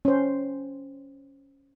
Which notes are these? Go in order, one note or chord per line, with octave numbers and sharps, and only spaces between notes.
C#4 C5